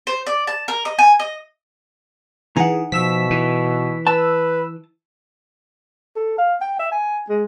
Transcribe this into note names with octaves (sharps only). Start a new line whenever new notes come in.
C5
D5
A5
A#4
D#5
G#5
D#5
E3 D#4 G#4 F#5
B2 F3 E5 E6 B6
E3
B4 A5 E6
A4
F5
G5
E5
G#5
G#3